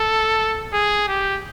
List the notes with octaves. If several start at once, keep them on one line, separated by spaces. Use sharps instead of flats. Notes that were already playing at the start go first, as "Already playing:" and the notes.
Already playing: A4
G#4
G4